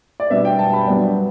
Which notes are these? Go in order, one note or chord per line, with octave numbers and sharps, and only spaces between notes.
D5
B2 G3 B3 D4 E5
G5
A5
B5
G2 F#3 B3 D4